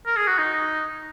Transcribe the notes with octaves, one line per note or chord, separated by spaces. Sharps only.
A#4
G#4
F#4
D#4